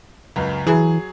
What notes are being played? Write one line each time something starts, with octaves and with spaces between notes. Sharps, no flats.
C#2 F#2
E3 F#3 G#4